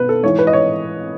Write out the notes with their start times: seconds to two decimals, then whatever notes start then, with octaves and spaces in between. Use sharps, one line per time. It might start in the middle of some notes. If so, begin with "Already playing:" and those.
Already playing: B2 B4
0.09 A4
0.23 G#2 E3 C#5
0.39 B4
0.47 D#5
0.53 C#5